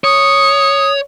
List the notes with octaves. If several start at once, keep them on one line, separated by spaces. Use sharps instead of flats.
C#5 D#6